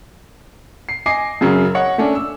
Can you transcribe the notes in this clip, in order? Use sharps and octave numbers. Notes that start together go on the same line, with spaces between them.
C7
D#5 G#5 D6 C7
F#2 C#3 F#3
C#5 D#5 F#5
A3 C#4 D4
E6